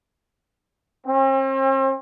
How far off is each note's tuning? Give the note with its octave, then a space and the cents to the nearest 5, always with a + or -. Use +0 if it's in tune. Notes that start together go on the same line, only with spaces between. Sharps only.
C4 +45